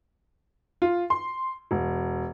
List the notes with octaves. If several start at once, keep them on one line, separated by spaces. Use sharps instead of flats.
F4
C6
E1